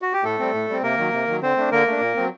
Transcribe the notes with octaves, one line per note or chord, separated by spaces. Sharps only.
F#4
G4
A2 A3 A4
G3 C4
A2
G3 C4
C3 A#3 A#4
D#3 F#3
C3
D#3 F#3
D3 C4 C5
A3 D4
D3 A#3 A#4
A3 D4
A#2
F#3 C4